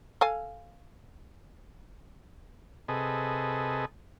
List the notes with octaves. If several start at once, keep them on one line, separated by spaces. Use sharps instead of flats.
A4 F5 G#5
C3 G#4 A4 B4 D#5